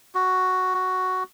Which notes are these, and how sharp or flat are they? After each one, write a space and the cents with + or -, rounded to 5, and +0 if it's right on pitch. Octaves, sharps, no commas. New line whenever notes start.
F#4 +5
F#4 +5